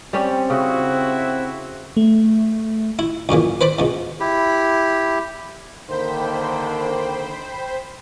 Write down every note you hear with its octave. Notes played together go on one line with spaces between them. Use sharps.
G3 C4 C#4 G4
C#3 E4 F#4 E5
A3
E4
C#2 F#2 A#2 E3
B4 C5 D5 B5
C#2 B2
E4 G4
D3 D#3 A#3 C5 G5 B5